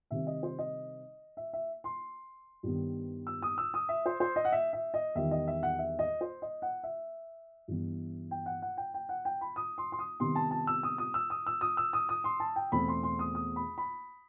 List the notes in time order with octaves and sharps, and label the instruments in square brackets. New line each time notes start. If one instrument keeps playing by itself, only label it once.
[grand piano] C3 D#3 G3 C4 E5
D#5
C5
D#5
E5
E5
C6
G2 D#3 G3 B3
E6
D#6
E6
D#6
E5
C5
C5
D#5
F#5
E5
E5
D#5
E2 D#3 G3 E5
D#5
E5
F#5
E5
D#5
C5
D#5
F#5
E5
G2 E3 B3
G5
F#5
F#5
G5
G5
F#5
G5
B5
D#6
C6
C6
D#6
C3 D#3 G3 B3 C6
A5
A5
E6
D#6
D#6
E6
D#6
E6
D#6
E6
D#6
D#6
C6
A5
G5
E2 B2 A3 C4 B5
C6
C6
D#6
D#6
B5
B5